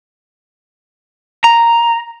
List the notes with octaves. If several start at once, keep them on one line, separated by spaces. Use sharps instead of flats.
A#5